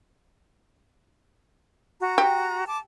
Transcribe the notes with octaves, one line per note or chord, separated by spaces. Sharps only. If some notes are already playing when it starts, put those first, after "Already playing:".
F#4 A#5
G4
A5 D6